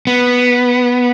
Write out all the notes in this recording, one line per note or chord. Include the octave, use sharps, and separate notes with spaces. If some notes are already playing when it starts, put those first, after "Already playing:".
B3